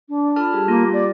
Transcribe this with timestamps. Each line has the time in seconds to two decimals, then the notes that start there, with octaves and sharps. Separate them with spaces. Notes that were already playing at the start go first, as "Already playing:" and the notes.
0.09 D4
0.36 F4 A4 A5 B5 F6
0.53 G3 G4 G#4
0.68 A#3 F4
0.93 D5